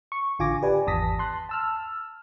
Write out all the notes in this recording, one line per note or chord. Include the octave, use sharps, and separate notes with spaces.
C#6
A1 D3 F4 G#5 D6 A#6
G4 B4 D5 G#5
G#1 E2 A5 D#6 A#6 B6
A5 C6 F#6
A5 E6 F6